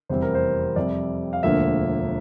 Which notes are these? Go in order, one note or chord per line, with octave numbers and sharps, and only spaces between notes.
F1 E2 E3 G3 C4 C5
A#4
C5
F2 C3 G3 D5
F5
E1 D2 D3 F3 A#3 E5